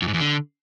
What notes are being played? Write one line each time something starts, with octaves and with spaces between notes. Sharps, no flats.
F2
G#2
E2
D3